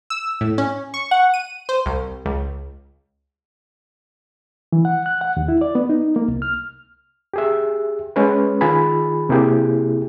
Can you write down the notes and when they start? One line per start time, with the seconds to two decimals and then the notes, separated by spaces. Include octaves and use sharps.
0.10 E6
0.41 A2
0.58 C#4
0.94 C#6
1.11 F#5
1.34 D#7
1.69 C5
1.86 C2
2.25 C#2
4.72 E3
4.85 F#5
5.06 F#6
5.21 F#5
5.37 D#2
5.48 E4
5.61 D5
5.75 B3
5.89 D#4
6.16 A#3
6.28 C2
6.42 F6
7.34 G4 G#4 E5
8.16 G#3 C#4 B4
8.61 D#3 F4 G#4 G#5 B5
9.29 C3 A#3 E4 G4 G#4